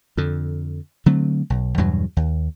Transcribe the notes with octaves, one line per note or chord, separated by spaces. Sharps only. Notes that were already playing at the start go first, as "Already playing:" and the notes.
F2 D3
D3 F#3 A3 C4
B1
E2 G2 B2 F#3
D#2